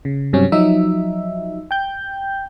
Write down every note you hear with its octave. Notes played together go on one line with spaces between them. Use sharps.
C#3
G2 C3 F#3 C#4
F3 F#3 D#4 E5
G5 G6